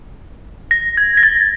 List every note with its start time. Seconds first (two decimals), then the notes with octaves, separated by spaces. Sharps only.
0.71 A#6
0.97 G#6
1.17 A#6
1.23 A6